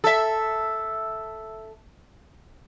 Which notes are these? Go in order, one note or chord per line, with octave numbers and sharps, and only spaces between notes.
A4 E5